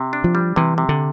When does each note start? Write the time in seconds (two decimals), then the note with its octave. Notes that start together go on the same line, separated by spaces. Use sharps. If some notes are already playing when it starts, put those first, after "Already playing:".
Already playing: C3
0.13 D4
0.24 F3
0.35 G3
0.56 C3 E3
0.78 C3
0.89 D3